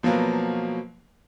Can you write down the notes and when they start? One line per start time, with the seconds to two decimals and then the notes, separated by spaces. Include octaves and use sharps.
0.03 B2 F3 F#3 A#3 B4